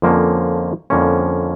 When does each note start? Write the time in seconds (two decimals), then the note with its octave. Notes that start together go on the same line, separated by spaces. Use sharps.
0.02 F2 D3 F3 A#3 C#4
0.90 F2 D3 F3 A#3 C#4